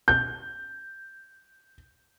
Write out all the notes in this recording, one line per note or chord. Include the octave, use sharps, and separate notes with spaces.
G6